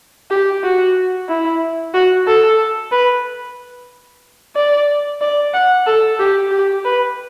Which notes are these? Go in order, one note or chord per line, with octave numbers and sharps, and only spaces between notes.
G4
F#4
E4
F#4
A4
B4
D5
D5
F#5
A4
G4
G4
B4